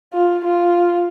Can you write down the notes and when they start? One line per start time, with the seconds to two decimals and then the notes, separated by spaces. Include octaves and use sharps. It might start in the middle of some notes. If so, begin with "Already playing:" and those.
0.14 F4
0.44 F4